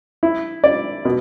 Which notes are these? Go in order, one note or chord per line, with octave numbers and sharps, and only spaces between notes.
E4
D5
B2